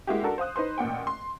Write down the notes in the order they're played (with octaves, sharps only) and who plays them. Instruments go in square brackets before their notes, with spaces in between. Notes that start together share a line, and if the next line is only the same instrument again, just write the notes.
[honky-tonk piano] G#3 A#3 E4 F#4 G4
D4 F#4 A4 A#4
C5 F5 D#6 F#6
D#4 B4 C5 C6
A1 A#2 F#5 G5
C6